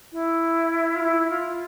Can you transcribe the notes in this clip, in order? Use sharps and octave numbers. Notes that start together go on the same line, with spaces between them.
E4
F4
E4
F4